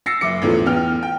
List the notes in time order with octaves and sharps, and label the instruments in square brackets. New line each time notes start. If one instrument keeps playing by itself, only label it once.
[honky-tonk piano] E6 A6 A#6 C7 C#7
F#1 E5 D6 C#7
A1 E2 D3 F3
E2 B3 G5 F6
G5